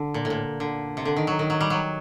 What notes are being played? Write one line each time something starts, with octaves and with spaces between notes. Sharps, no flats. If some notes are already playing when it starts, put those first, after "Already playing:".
Already playing: D3
A#2
A2
A#2
D3
C3
D3
D#3
F#3
D#3
F#3
G3
F#3